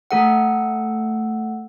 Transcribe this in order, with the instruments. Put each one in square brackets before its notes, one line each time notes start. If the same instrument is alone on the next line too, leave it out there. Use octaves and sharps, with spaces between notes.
[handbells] A3 A4 F#5